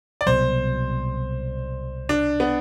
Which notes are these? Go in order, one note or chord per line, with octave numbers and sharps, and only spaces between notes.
D5
C2 B2 F#3 C5
D4
B3